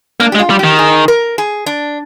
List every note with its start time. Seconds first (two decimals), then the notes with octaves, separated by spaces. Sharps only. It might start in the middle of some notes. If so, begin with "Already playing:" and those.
0.20 A#3 D4
0.32 G4
0.35 G#3
0.39 F4
0.50 G3
0.59 D#3 G4
0.79 G#4
1.08 A#4
1.38 G#4
1.66 D4